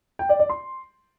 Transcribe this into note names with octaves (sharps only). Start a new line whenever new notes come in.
G5
D5
D5
C6